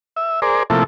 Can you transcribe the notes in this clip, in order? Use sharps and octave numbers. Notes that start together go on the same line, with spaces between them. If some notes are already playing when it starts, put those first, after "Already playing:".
E5
G#4 A#4 C5 D5
C3 F3 A3 A#3 E4 A4